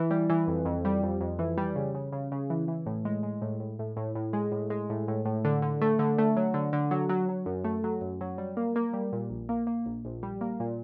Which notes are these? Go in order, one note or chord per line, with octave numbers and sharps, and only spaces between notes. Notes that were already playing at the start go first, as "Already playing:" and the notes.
Already playing: E3
G3
E3
F2
F2
G3
F2
F2
E3
G3
C#3
C#3
C#3
C#3
E3
E3
A2
G#3
G#3
A2
A2
A2
A2
A2
G#3
A2
G#3
A2
A2
A2
D3
D3
A3
D3
A3
F#3
D3
D3
F#3
F#3
F#3
F#2
A3
F#3
F#2
F#3
G3
A#3
A#3
G3
A#2
A#1
A#3
A#3
A#1
A#1
G3
A#3
A#2